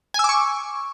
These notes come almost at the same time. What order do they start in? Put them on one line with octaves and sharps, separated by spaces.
G#5 E6 D6 C#6